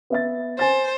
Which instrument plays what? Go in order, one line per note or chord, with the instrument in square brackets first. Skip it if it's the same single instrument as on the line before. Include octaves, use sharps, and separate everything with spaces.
[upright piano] B3 E5 A6
[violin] C5 [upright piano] G#5 A6